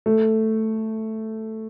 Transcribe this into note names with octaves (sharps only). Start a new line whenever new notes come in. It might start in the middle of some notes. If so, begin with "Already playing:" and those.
A3